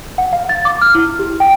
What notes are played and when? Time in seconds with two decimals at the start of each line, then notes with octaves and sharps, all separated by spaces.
0.18 F#5
0.33 F5
0.49 A6
0.65 D6
0.81 F6
0.95 E4
1.19 G4
1.40 G5